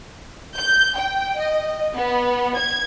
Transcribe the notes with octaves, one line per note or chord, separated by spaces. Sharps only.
G6
G5
D#5
B3
G#6